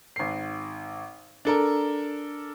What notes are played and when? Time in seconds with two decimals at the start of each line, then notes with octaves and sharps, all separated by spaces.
0.16 G#1 C7
1.45 D4 A4 A#4